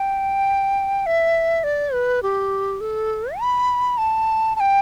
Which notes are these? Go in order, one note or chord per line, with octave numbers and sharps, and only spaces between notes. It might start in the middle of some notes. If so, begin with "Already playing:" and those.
Already playing: G5
E5
D5
B4
G4
A4
B5
A5
A5
G5